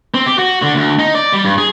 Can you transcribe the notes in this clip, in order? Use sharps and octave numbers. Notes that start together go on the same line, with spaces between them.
C4
G4
F#4
D3
D2
D#4
D5
G3
G2
G#4